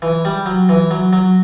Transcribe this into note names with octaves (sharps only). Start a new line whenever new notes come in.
E3
G3
F#3
E3
F#3
F#3